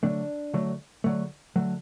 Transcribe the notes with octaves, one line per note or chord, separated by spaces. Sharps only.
D3 F#3 A3 D4
D3 F#3 A3
D3 F#3 A3
D3 F#3 A3